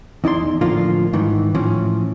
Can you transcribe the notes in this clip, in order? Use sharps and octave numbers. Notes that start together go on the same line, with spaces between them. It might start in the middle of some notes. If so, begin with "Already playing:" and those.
E2 D#4 E4 D5 C6
A2 D3 F3 A#3 F4
G#2 D#3 E3
A2 E3 F3 C#4